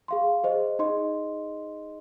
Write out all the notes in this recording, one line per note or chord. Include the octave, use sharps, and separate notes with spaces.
G#4 F5 C6
G#4 C5 D#5
D#4 G#4 D#5 C6